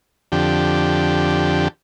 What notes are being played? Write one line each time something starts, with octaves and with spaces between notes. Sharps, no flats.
F2 D3 G4